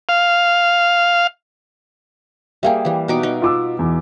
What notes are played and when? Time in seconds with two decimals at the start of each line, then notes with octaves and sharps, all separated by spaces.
0.09 F5
2.63 G3 A#3 G#4 E5 F5 G5
2.85 E3 G3
3.08 B2 D#4 D6
3.23 D#4
3.42 F4 D6 E6
3.79 E2